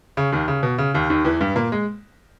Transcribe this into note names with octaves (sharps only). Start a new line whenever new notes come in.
C#3
D#2 D#3
C#3
B2
C#3
D#2 D#3
D#2 D#3
E2 E3
G2 G3
A#2 A#3
G#3